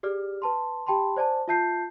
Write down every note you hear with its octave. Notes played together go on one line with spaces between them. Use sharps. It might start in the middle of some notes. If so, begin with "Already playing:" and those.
G4 G#4 D5 F6
B4 A5 C6
G4 G5 A5 B5 C6
C5 D5 G#5 A5
F4 E5 A5 G6 C7